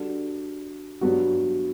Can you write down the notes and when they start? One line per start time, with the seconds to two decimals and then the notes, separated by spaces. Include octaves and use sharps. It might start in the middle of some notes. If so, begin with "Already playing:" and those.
Already playing: G3 D4 F#4 A4
1.01 G2 F#3 B3 F#4